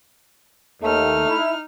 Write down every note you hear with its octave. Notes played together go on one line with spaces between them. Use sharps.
D#2 A3 D#4 F6
E4